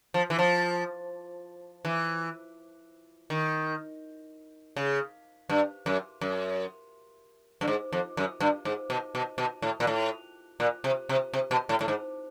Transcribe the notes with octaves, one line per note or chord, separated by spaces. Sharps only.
F3
E3
F3
E3
D#3
C#3
G2
F#2
F#2
G2
G#2
F2
F#2
G2
G#2
B2
B2
B2
A2
A#2
A2
A#2
C3
C3
C3
B2
A2
A2
G#2